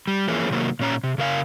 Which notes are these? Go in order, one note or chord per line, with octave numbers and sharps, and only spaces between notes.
G3
E3 F3 A#3 C#4 G#4
C3 D#3 F#3 A#3
A#2 C#4 A#5
C3
C#3 A#4 F5 G#5